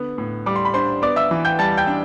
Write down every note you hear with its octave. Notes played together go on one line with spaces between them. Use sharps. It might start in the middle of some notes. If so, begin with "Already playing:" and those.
Already playing: D3 B3
A2
G3 D6
C6
B5
D4 C5 C6
B3 D5 D6
E5 E6
E3
G5 G6
G3 A5 A6
G5 G6
D4